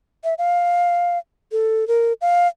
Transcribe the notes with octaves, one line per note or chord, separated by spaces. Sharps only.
E5
F5
A4
A#4
F5